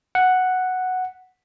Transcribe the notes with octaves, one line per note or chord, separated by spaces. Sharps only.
F#5